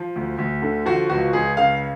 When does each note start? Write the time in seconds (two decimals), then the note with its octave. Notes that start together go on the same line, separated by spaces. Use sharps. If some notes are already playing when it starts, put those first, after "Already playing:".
Already playing: F3
0.16 D2
0.38 D2
0.62 D3
0.86 F3 F#4
1.10 C#2 F#4
1.33 C#2 G#4
1.57 C#3 F5